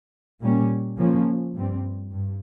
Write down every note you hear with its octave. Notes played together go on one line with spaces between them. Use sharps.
A#2 G3 A#3 C#4
C#3 F3 A#3 C#4
G2 G3 C4
G2